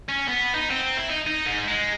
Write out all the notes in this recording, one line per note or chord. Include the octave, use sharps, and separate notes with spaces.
C#4
B3
D#4
C4
E4
D#4
D#4
G#2
G#3